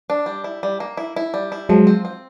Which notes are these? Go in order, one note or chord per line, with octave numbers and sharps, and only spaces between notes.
D4
G3
E4
G3
A#3
E4
E4
G3
E4
F3 F#3 G#3
C4
C4